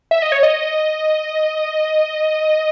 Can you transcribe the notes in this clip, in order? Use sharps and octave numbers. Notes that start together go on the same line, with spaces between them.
E5
D#5
C#5
D#5